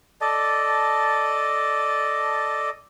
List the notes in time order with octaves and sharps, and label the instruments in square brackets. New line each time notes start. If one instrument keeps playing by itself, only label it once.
[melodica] A4 D5 D#5 A5